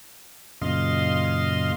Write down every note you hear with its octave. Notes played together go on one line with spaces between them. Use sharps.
F#2 A#2 C#3 D#5 F5 C6